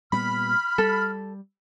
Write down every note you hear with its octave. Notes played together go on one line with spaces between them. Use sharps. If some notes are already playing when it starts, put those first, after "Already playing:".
A#2 G3 B3 B5 F6
G3 A4